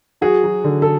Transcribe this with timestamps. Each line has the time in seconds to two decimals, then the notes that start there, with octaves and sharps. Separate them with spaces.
0.21 F#3 F#4 G#4
0.44 F#3
0.64 D3
0.82 A4